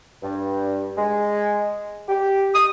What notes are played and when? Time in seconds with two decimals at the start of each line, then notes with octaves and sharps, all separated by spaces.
0.23 G2
0.97 G#3
2.09 G4
2.53 D#6